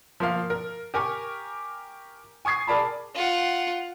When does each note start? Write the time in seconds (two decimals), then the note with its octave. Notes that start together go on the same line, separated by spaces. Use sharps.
0.20 F3 A#3 F5
0.50 A#4
0.94 G4 A#4 G#5 C#6
2.45 G#5 C#6 D#6 G#6 C7
2.67 G#4 A#4 D5 A5 B5
3.15 F4 F#5